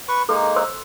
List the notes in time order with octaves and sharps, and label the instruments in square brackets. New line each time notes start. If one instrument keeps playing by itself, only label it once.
[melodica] B4 C#6
[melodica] G#3 A#3 D#4 [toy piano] A4
[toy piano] C5 C6 E6